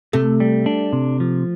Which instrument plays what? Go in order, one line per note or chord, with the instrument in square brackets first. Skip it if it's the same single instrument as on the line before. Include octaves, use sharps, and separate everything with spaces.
[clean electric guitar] C3 [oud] A3
[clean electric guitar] G3
D4
C3
F3